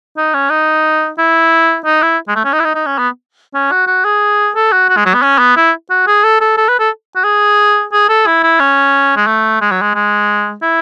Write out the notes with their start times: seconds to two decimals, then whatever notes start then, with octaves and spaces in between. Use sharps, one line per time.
0.17 D#4
0.34 C#4
0.50 D#4
1.18 E4
1.85 D#4
2.02 E4
2.28 G#3
2.35 A3
2.45 C#4
2.53 D#4
2.60 E4
2.65 D#4
2.75 D#4
2.86 C#4
2.98 B3
3.54 C#4
3.71 F#4
3.87 F#4
4.05 G#4
4.56 A4
4.72 F#4
4.89 F#4
4.97 G#3
5.06 F#3
5.14 B3
5.22 C#4
5.39 B3
5.57 E4
5.90 F#4
6.07 G#4
6.24 A4
6.41 A4
6.57 A4
6.69 B4
6.79 A4
7.16 F#4
7.24 G#4
7.93 G#4
8.09 A4
8.26 E4
8.43 E4
8.60 C#4
9.16 G#3
9.27 A3
9.61 G#3
9.71 F#3
9.82 G#3
9.94 G#3
10.62 E4